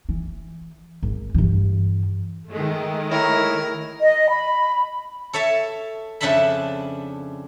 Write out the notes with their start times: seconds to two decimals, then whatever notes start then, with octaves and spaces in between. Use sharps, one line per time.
0.09 E3
1.03 G#1
1.34 G2 E3
2.50 D#3 G#3 A3
3.11 E4 A#4 C#5
4.01 D#5
4.29 B5
5.33 A4 C#5 E5 A5
6.21 F2 C#3 D4 E5 A5 B5